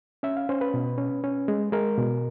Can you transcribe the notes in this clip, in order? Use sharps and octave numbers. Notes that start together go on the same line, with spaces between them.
C#4 E5
F5
C#4 C5
B4
B2
C#4
C#4
G#3
G#3 A#4
B2